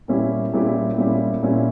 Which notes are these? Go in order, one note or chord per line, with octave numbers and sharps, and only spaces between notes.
A#2 G3 C#4 E4 G4
A#2 G3 C#4 E4 G4
A#2 G3 C#4 E4 G4
A#2 G3 C#4 E4 G4